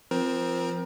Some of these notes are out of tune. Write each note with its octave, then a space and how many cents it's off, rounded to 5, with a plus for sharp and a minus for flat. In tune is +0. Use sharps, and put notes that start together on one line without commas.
F3 -10 C4 +0 A#4 +25